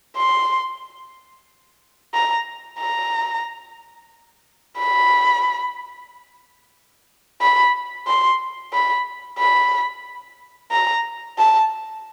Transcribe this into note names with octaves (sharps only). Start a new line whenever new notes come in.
C6
A#5
A#5
B5
B5
C6
B5
B5
A#5
A5